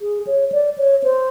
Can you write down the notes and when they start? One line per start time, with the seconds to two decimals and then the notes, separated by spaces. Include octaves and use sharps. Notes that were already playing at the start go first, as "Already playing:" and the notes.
0.01 G#4
0.27 C#5
0.52 D5
0.78 C#5
1.04 C5